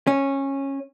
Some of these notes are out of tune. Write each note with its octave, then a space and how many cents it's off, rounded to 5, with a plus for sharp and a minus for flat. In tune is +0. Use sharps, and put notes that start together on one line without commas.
C#4 -15